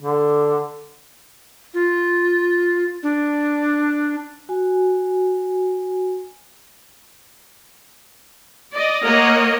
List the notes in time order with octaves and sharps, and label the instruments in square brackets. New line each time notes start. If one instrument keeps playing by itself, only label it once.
[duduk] D3
[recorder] F4
D4
[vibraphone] F#4 G#5
[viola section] D5 D#5
A#3 A#4 C#5 D#5 F#5